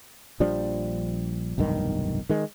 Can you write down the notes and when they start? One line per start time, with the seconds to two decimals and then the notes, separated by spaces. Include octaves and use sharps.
0.40 A#1 F3 G3 D4
1.58 F1 B1 G2 D#3
2.29 D#3 G#3